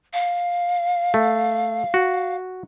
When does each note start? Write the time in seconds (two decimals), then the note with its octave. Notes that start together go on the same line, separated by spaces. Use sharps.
0.13 F5
1.14 A3
1.94 F#4